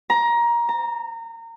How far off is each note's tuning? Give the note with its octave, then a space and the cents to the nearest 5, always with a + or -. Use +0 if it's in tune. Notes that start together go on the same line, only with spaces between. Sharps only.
A#5 +20
A#5 -25